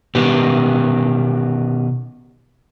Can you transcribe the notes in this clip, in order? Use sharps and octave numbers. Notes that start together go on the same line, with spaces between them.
B2 D#3 B3 G4